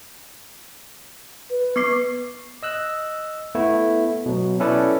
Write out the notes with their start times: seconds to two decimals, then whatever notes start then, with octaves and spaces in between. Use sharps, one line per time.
1.50 B4
1.76 B3 D6 C7
2.63 D#5 E6 F#6
3.55 A3 B3 E4
4.26 B2 F#3
4.60 C#4 E4 A4 B4 D5